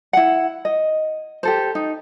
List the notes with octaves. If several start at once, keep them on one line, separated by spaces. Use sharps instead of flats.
E4 F#5
D#5
G4 A4 C5
D#4